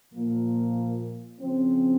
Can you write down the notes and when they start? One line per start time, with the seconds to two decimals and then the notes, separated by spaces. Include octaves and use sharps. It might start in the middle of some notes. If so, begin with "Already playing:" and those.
0.14 A#2 F3 A#3
1.39 C#3 F3 C4